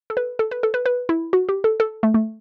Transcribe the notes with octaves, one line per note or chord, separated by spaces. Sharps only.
A4
B4
A4
B4
A4
B4
B4
E4
F#4
G4
A4
A4
A3
A3